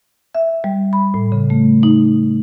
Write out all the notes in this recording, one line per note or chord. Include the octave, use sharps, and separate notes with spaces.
E5
G3
B5
A2
C#3
A3
D#4